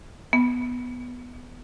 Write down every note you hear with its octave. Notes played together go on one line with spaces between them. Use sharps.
B3